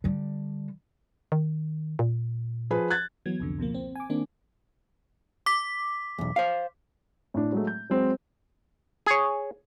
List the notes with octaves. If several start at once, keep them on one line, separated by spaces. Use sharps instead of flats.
D3 G3
D#3
A#2
F3 G#4 B4
F#6 G#6 A6
E3 F#3 B3 G#6
C2 F2 D3
C#2 B2 F3 A#3
C4
G#5 D6
D#3 A#3 C4 D4
D6 B6
B1 E2
C5 F5
A2 D4
F#3 G#3 A3
G6
F#3 G#3 C4
G#4 C#5